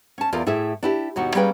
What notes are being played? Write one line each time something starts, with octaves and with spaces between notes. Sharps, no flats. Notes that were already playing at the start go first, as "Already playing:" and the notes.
C#4 A5
E2 F4 A#4 D5
A2 E4 G#4 E5
D4 E4 G4
D#2 B2 D#4 F#4
G3 A#3 C#4 G#4 B4 G5